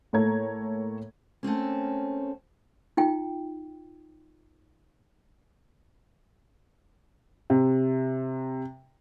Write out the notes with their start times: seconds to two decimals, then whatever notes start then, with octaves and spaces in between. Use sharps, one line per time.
0.13 A2 A3 A#3 C#5 A#5 G#6
1.43 A3 A#3 C4 C#4
2.97 D#4 F4 G5
7.50 C3